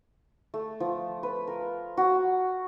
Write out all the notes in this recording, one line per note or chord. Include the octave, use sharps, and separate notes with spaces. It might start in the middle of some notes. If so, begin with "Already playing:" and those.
A3
F3
B4
A#4
F#4